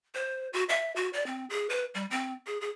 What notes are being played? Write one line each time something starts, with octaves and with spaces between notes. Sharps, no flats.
C5
F#4
E5
F#4
D5
C4
G#4
B4
G3
C4
G#4
G#4